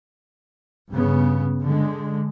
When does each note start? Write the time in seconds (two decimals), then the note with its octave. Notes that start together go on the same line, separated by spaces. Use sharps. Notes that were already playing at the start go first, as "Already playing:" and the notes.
0.90 G2 C#3 B3
1.62 D3 G#3